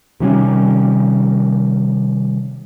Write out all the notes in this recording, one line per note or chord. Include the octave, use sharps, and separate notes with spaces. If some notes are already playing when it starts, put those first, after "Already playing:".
C3 D#3 G3 C#4